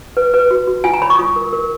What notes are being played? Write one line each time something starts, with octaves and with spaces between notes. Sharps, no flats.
B4
B4
F#4
F#4
F4 G#5
A#5
C#5 B5
C#6
F4 D#6
A#4
A#4